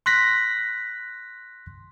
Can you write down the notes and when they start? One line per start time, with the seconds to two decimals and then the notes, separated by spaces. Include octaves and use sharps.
0.06 C6 F#6 A#6 B6